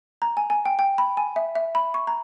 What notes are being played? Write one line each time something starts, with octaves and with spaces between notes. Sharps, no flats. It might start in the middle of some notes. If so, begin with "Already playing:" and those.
A#5
G#5
G#5
G5
G5
B5
G#5
E5
E5
B5
C#6
A#5